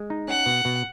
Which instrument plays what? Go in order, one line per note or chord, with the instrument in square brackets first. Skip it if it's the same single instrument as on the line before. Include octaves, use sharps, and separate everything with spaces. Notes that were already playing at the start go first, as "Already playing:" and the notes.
Already playing: [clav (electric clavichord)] G#3
D#4
[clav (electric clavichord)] C#4 [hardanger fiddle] F#5
[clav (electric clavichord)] B2
B2